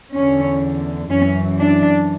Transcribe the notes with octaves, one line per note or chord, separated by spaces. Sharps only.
E2 D3 C#4
F#2 E3 C#4
D4